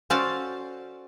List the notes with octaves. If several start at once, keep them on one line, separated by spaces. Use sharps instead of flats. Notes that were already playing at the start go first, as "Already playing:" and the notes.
C#4 F#4 A4 C5 D5 F5